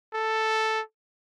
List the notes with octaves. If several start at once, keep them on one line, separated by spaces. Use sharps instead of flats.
A4